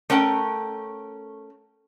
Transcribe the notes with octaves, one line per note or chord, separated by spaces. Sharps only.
A3 C#4 A#4 F#5 G5